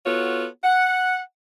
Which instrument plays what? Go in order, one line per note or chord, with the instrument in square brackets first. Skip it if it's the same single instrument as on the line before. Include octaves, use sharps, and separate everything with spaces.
[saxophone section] B3 F4 F#4 A4 C#5
F#5